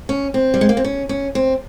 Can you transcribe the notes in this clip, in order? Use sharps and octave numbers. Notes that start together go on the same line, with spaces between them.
C#4
C4
G3
G#3
A#3
C4
C#4
C#4
C4